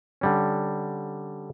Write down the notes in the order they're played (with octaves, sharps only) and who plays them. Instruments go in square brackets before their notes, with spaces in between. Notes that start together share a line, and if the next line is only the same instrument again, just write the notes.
[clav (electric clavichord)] D3 G3 C#4